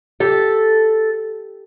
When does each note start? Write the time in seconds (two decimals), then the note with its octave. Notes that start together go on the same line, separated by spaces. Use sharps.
0.20 G4 A4